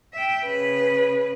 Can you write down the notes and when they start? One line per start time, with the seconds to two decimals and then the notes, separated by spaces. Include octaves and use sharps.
0.14 E5 G5
0.45 C#3 B4